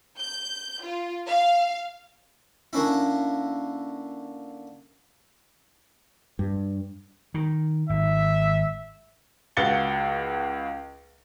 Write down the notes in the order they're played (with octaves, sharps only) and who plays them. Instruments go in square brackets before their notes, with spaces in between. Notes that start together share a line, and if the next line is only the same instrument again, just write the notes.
[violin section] G6
F4
F5
[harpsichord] D3 A#3 C#4 E4
[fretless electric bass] G2
[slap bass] D#3
[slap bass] G#1 [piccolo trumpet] E5
[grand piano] C#2 F#4 F5 A6 C#7 G7